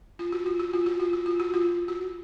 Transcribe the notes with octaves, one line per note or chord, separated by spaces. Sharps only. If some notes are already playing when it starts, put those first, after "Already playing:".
F4
F#4
F4
F#4
F4
F#4
F4
F#4
F4
F#4
F4
F#4